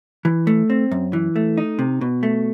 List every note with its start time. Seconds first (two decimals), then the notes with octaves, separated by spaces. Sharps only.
0.25 E3
0.47 A3
0.70 C4
0.91 F#2
1.13 E3
1.36 A3
1.58 D#4
1.79 C3
2.01 B2
2.23 A3